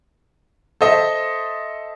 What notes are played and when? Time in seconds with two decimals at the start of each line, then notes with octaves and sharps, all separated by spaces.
0.81 A4 C5 D#5 E5